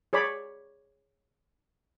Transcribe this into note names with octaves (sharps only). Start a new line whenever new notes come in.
G#4 C#5 D5 B5